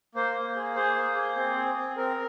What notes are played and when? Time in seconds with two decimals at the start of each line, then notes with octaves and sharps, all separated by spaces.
0.15 A#3 C5
0.36 A#3
0.56 G#4
0.75 G#4 C5
0.96 A#3
1.16 G#4
1.36 C4
1.57 G#4
1.76 C4
1.96 C4 A#4